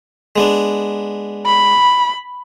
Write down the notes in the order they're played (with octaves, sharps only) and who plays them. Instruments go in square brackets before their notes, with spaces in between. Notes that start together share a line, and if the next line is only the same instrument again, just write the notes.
[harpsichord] G#3 B3 D4
[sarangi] B5